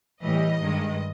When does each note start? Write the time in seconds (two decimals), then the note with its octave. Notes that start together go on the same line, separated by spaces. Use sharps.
0.23 A2 E3 G3 D#5
0.61 G2 D#3 G#3